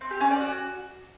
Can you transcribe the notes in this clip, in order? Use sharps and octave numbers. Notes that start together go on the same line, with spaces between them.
C4
G4
C#4
D5
F#4